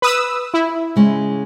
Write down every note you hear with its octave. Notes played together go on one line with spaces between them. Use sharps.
B4 D#6 E6
E4
C#3 G#3 C#4